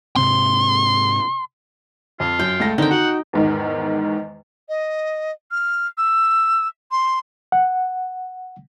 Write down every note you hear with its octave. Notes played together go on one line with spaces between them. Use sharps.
G#2 C3 C4 C6
F2 F4
F#2 G5
C#2 A3 A#6
D3 D#3 C4 D#4 G5
F#4 F#5
E2 G#2 D#3
D#5
F6
E6
C6
F#5